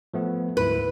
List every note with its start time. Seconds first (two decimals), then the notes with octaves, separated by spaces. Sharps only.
0.14 F3 A3 B3
0.57 D2 G#2 E4 B4